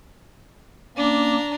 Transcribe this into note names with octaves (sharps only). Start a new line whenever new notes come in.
A#3 C#4 D4 A#5 D6